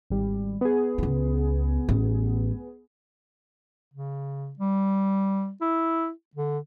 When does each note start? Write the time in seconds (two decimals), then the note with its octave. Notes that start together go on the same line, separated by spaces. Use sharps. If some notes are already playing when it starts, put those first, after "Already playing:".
0.10 G#1 G3
0.61 B3 G#4
0.98 C#2 F4
1.89 A1 C#4
3.94 C#3
4.59 G3
5.61 E4
6.36 D3